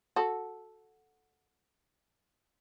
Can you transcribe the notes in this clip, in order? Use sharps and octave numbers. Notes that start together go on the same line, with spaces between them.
F#4 A4